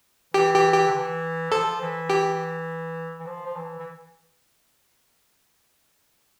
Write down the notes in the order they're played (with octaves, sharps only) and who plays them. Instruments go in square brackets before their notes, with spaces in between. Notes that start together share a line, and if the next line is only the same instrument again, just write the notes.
[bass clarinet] E3 [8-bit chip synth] G4
[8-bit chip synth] G4
G4
[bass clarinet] D3
E3
[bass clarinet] F3 [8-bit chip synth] A4
[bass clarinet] E3
[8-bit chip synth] G4
[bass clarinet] E3
F3
F3
E3
E3